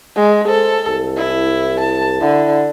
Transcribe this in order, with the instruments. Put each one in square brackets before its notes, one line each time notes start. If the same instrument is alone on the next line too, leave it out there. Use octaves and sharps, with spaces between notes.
[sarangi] G#3
[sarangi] A4 [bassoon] C5
[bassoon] C2
[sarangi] E4
A5
[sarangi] D3 [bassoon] E4